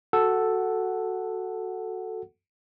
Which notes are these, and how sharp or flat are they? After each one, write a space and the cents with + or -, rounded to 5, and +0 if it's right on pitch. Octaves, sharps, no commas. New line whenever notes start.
F#4 +0 A4 +0 F#5 +0